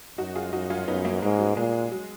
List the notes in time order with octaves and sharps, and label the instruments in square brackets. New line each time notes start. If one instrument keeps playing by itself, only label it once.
[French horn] F#2 [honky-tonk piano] D#4 F#4
[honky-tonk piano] F4 G#4
[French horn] F#2 [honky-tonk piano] D#4 F#4
[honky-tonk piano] C#4 F4
[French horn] F#2 [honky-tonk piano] B3 D#4
[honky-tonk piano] A#3 C#4
[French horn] G#2 [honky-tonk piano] G#3
[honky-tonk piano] F#3
[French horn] A#2 [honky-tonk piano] G#3
[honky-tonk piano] F#3